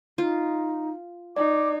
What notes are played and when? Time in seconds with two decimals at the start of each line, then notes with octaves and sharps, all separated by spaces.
0.18 D#4 F4
1.36 D#4 D5 D6